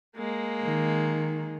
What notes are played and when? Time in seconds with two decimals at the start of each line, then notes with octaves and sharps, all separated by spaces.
0.17 G#3 A#3
0.63 D#3